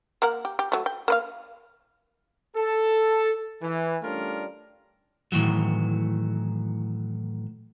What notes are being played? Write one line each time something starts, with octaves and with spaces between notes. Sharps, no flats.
A#3 A#4 F#5
G4
G4
F#3 A3
G5
A#3 B4 F5
A4
E3
G3 A3 C#4 D4 F4 A#4
A2 D#3 E3 F#3